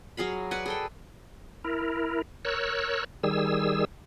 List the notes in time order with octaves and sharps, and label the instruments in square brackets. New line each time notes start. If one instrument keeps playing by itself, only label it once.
[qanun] F#3 G#4 F5 B5
B4 D5 F#5 G#5
G#4 A4 G5
[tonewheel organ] E4 A#4
A#4 C#5 E6 F#6
D#3 G3 G#4 E6